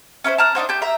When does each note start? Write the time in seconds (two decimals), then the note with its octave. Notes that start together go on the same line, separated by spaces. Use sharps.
0.24 C#4 E4 A#4 C5
0.38 A5 A#5 F6 F#6
0.55 D4 D#4 F#4 C5
0.69 G4 A5 G6
0.82 E5 A#5